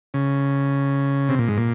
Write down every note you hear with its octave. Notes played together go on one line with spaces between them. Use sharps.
C#3
C3
A#2
G#2
A#2